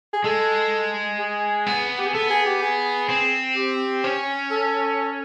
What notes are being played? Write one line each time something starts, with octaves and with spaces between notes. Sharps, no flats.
G#4
G#3 A4
G#4
B3
G4
G#4
B3 A4
G#4
G4
G#4
C4
G4
C#4
A4